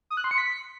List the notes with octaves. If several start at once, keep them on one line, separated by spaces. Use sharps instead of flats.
D#6
F#6
C6
C#7
B6